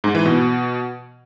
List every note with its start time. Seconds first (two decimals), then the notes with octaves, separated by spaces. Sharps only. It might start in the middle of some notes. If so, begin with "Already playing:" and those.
0.04 G#2
0.15 E3
0.26 B2